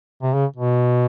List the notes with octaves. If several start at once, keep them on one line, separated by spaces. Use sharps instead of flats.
C3
C#3
B2